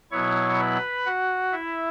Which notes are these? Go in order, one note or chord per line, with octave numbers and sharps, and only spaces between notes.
B2 F#3 B3 E4 C#5 C#6
B4 B5
F#4 F#5
E4 E5